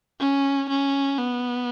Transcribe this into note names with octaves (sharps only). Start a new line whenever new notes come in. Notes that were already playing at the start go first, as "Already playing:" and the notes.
C#4
C#4
B3